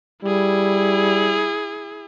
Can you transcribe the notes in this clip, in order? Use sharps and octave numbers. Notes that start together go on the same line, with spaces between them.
G3 E4 G#4